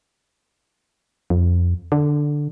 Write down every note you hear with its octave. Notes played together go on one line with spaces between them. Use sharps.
F2
D3